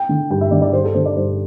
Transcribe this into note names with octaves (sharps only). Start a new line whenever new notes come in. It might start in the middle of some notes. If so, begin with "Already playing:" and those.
Already playing: G5
D3
G2 G5
E5
D3 D5
D5
G2 C5
A4
D3 C5
D5
G2 C5